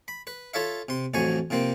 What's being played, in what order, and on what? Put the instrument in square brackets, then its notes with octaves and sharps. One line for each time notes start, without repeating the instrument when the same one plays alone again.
[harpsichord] B5
B4
F4 A4 C#5 E5 F5
C3 C6
A1 F2 F3 F#3 G#5 C#6
C3 F3 A#3 C4